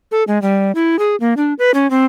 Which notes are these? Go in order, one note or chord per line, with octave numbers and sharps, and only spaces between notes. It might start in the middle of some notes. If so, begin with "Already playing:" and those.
A4
G#3
G3
E4
G#4
A#3
D4
B4
C#4
C4